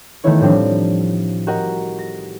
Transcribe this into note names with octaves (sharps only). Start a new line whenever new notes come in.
D#3 E3 A3 B3 E4 C#5
A2 F3 G3 C4 D4
F#4 G4 A#4 D#5 F#5
A#6